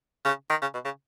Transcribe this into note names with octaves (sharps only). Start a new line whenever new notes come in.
C#3
D#3
C#3
B2
C#3